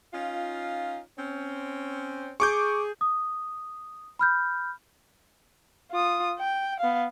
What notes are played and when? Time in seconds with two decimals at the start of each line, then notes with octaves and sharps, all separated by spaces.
0.13 C#4 D#4 F4
1.17 C4 C#4
2.40 G#4 C#6 D6 G6
3.01 D#6
4.19 B5 F6 G6
5.92 F4 D#6
6.39 G5
6.80 B3 F5